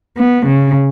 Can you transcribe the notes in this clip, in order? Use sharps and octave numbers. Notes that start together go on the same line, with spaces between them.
B3
C#3